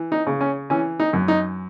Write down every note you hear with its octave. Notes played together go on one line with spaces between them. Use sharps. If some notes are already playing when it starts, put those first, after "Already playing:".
Already playing: E3
D#4
C#3
C#4
E3 C#4
D#4
F#2
D#4